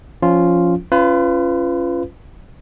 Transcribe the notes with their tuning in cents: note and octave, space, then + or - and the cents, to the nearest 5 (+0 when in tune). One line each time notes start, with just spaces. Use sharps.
F3 +0 C#4 +10 F4 -5
C#4 +0 F4 -20 B4 +25